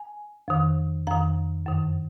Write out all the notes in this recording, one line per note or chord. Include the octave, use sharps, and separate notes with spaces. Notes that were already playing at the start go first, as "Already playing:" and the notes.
Already playing: G#5
F2 D#3
F2 D#3 A#5
F#2 D#3